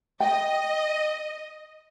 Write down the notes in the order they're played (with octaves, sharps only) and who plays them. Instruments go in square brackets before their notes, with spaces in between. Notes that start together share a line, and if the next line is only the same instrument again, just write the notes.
[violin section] D#5 [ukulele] G5